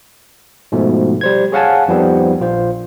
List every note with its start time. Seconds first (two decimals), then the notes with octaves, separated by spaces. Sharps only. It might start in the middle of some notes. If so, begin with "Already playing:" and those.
0.72 G#2 B2 F3 A3
1.21 G3 C5 G#6
1.52 G#4 C#5 F5 F#5 G#5 A5
1.88 F2 F3 G3 B3 C4 D#4
2.40 A#1 F4 C5